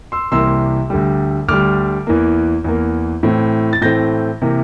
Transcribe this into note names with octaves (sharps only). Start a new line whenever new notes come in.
C6 E6
C2 C3 E3 A#3 C6 E6
D2 D3 G3
D2 D3 G3 D6 F6
E2 E3 A#3
E2 E3 A#3
A2 E3 A3 C4
A6
A2 E3 A3 C4 G6 A#6
C3 E3 A#3